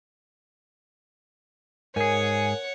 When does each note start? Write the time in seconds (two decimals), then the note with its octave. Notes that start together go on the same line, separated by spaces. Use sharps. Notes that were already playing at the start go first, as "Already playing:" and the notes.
1.96 G#2 G#4 A#4 C#5 F#5 G#5